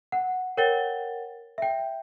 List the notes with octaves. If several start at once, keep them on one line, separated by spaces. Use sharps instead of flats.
F#5
A#4 C#5 F#5 G5 A6 G7
E5 G5